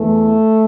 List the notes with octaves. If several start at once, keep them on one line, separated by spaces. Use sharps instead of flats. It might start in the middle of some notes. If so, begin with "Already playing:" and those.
Already playing: E2 E3 A3